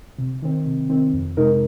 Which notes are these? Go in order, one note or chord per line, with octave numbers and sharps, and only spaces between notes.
C3
D#3 C4
C3
D#3 C4
F2
C3 G#3 D#4 A#4